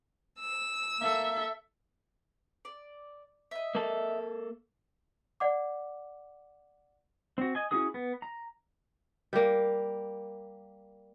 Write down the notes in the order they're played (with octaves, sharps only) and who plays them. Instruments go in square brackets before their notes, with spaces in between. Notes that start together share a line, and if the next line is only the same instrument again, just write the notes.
[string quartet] E6
[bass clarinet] A#3 [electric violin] A4 E5
[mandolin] D5
D#5 E5
[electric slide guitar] A#3 A4
[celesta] D5 F#5 D6
[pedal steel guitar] C4 F#4
D#5 G#5
C#4 E4 F#4 G#4 D#6
B3
A#5
[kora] G3 A#3